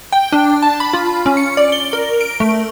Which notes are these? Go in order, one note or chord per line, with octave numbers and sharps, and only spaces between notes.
G5
D4
A5
B5
F4
C#4
C#7
D5
G7
A#4
D7
A3